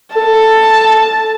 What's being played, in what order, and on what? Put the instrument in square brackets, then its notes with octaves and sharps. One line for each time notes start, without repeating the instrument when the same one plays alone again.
[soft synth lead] A4 [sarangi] A5